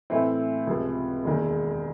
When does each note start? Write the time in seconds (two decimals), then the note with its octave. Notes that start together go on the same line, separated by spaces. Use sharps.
0.10 A2 E3 A3 C4 E4
0.67 C#2 C3 F3
1.25 E1 D#2 D#3 G#3